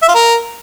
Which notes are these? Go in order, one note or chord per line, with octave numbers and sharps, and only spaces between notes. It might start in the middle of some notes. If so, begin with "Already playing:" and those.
E5
F4
A#4